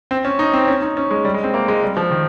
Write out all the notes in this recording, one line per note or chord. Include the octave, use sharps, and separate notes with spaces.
C4
C#4
D#4
C4
C#4
D#4
C#4
G#3
G3
G#3
C4
A#3
G#3
G3
F3
D#3